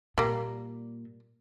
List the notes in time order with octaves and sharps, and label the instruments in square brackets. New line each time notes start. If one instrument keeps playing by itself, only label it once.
[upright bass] A#2 [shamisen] G3 A#3